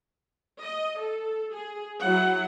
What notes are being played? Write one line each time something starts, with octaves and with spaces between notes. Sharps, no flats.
D#5
A4
G#4
F#3 E4 F#5